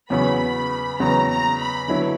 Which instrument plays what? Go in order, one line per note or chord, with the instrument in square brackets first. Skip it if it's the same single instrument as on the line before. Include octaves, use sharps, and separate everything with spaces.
[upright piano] E2 C#3 F#3 B3 [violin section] B5
[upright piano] E2 C#3 F#3 B3 [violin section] A#5
[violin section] A#5
B5
[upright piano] D3 F#3 B3 E4